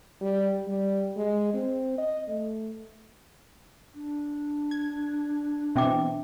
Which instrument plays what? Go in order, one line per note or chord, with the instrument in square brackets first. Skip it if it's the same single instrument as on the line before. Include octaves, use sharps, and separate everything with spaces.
[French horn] G3
G3
G#3
C4
D#5
A3
[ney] D4
[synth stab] G#6
[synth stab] B2 E3 C4 [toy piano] E5 G5 D6